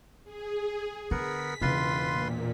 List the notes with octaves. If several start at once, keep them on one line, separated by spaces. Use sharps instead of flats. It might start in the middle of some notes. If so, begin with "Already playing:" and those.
G#4
D3 B3 A#4 F#5 B6
E1 C#3 E3 F4 B4 C6
A#2